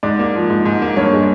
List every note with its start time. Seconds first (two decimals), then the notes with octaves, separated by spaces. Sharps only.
0.03 G#2 D5
0.19 A#3
0.35 F3
0.50 G#2
0.65 G#2
0.82 A#3
0.97 G2 C#5
1.13 G#3